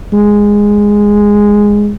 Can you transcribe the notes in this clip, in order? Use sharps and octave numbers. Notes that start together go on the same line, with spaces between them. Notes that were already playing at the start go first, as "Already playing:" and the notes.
G#3